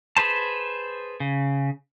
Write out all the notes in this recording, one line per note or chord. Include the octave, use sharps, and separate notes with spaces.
G#4 B4 C5 A5
C#3